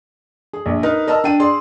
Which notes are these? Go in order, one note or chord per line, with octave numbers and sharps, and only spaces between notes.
G#4
A#1
D#4 A#4 B4
A#4 D#5 A5 A#5 E6
D4 G5 D#7
G#4 D5 C6